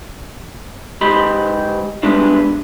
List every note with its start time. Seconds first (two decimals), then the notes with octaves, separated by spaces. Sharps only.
1.01 G#2 G4 D#5 B5 C6
2.03 G3 G#3 B3 D4 E4